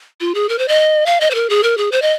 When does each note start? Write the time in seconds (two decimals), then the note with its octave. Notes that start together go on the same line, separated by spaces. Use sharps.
0.21 F4
0.35 G#4
0.49 A#4
0.58 C5
0.68 D#5
1.06 F5
1.21 D#5
1.31 C5
1.35 A#4
1.50 G#4
1.63 A#4
1.77 G#4
1.92 C5
2.02 D#5